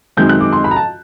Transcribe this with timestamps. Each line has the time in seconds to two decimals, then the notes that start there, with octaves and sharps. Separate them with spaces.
0.17 F#2 D#3 G#3 C4 G6
0.29 F#6
0.41 D6
0.53 C6
0.64 B5
0.71 A#5
0.76 A5